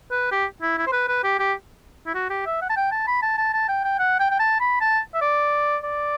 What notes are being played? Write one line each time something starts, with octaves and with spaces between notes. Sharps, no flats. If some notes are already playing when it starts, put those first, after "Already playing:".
B4
G4
E4
E4
C5
B4
B4
G4
G4
E4
F#4
G4
E5
F#5
A5
G5
A5
B5
A5
A5
A5
G5
G5
F#5
G5
G5
A5
B5
A5
E5
D5
D5